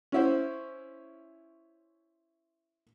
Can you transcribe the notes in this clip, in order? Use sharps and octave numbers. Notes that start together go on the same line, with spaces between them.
C#4 E4 C5